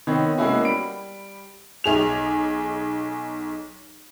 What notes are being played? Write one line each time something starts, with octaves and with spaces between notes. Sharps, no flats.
D#3 B3 C4 C#5
G#3 A#3 B3 C#4 E4 F#4
G3 B5 D7
B1 G#4 F7